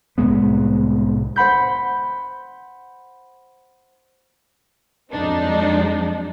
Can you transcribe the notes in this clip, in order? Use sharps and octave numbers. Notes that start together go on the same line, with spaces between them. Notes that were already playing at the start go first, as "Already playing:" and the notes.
C2 A2 G#3 B3
C5 F#5 B5 G6
F2 F#3 G#3 C4 D4 D#4